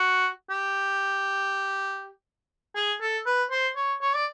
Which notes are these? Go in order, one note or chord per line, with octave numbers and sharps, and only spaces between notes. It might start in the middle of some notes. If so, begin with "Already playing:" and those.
Already playing: F#4
G4
G#4
A4
B4
C5
C#5
C#5
D5